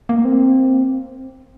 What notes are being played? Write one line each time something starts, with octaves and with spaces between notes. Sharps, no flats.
A#3
C4